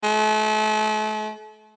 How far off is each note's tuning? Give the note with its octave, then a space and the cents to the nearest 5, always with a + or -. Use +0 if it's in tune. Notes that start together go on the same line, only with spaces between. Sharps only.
A3 -40